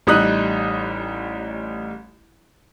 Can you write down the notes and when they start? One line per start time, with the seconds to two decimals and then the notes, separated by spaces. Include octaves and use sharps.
0.07 A1 G3 D#4 D#6 F#6